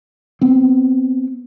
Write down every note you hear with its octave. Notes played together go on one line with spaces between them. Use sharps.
B3 C4